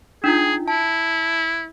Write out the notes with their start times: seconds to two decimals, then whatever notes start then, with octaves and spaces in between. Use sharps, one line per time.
0.24 D4 D#4 F4 G#4
0.68 E4 A5